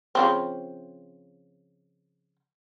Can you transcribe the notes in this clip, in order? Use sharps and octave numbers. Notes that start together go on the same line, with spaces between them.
C#3 F3 C4